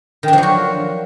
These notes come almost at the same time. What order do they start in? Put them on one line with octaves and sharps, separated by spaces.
D#3 D4 F3 F#3 F#4